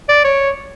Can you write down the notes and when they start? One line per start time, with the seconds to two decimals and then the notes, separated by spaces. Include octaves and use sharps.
0.09 D5
0.24 C#5